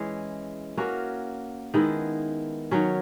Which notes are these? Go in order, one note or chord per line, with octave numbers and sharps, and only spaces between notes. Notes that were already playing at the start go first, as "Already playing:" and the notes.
Already playing: E3 G#3 C#4 E4
A#3 C#4 F#4 A#4
D#3 G#3 B3 E4
D#3 F#3 C#4